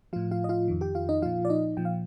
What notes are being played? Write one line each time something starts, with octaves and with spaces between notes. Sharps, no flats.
A2 F3 F4 F5
F4 F5
D#5
F4 F5
F2 D#3
G4 G5
F4 F5
D#4 D#5
A#2 F3 F4 F5
D5
D#4 D#5
A#2 F3 G5
F5